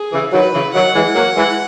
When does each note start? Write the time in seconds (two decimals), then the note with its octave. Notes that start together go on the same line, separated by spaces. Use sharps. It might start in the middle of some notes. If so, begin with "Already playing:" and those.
Already playing: G#4
0.12 C#3 E3
0.33 D#3 F#3 B4
0.53 C#3 E3
0.74 D#3 F#3 F#5
0.94 E3 G#3
1.15 F#3 A#3
1.37 E3 G#3